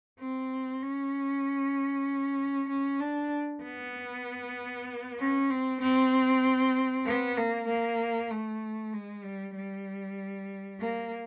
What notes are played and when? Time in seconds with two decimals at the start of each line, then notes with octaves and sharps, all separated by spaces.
0.19 C4
0.82 C#4
2.69 C#4
3.00 D4
3.63 B3
5.19 C#4
5.50 C4
5.81 C4
7.06 B3
7.37 A#3
7.68 A#3
8.31 A3
8.93 G#3
9.24 G3
9.55 G3
10.80 A#3